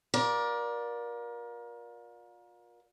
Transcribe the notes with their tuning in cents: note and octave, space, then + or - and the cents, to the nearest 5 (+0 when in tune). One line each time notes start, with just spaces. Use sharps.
F4 +35 A#4 +30 D5 +0